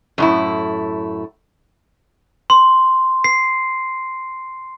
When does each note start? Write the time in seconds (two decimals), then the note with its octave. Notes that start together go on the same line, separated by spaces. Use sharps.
0.18 F#2 A2 E4
2.50 C6
3.24 C7